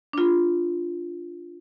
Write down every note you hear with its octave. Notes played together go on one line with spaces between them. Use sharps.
D4 F4